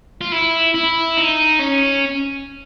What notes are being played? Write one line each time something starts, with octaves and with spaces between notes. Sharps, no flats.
F4
E4
E4
D#4
C#4